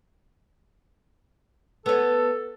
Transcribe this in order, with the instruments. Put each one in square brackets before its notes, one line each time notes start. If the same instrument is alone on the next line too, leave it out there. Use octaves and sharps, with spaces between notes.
[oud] B3 C#5 [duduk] A4